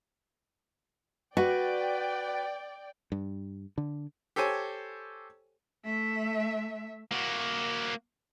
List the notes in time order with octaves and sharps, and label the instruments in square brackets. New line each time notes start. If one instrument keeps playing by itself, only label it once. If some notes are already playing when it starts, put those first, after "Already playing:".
[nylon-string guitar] F#4 [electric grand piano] B4 [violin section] D5 G5
[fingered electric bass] G2
D3
[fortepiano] G4 A4 C5 C#5 G#5
[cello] A3 E5
[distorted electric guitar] A#3 F#4